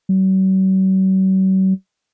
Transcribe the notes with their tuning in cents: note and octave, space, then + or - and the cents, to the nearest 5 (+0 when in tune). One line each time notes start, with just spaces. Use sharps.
F#3 +45